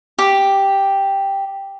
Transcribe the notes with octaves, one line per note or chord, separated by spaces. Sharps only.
G4 D6